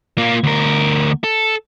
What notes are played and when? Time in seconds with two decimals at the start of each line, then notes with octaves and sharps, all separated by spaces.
0.18 A#3 F4
0.43 D2 A#4
1.24 A4